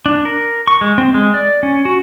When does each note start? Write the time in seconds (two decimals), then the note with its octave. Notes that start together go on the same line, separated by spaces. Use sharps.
0.06 D4
0.25 A#4
0.67 C#6
0.81 G#3
0.98 C4
1.14 G#3
1.34 D5
1.63 C#4
1.85 F#4